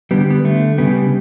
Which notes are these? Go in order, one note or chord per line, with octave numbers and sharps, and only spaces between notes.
D3 G3 B3
B3
D3 A3
C#3 G3 B3